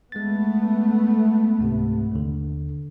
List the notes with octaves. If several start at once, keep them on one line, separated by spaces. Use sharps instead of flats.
G#3 A3 B3 A6
C#2 G#2 C3
D#2 D3